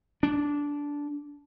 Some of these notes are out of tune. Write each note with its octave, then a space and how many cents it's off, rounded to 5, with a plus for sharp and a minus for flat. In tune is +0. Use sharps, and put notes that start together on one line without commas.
D4 -15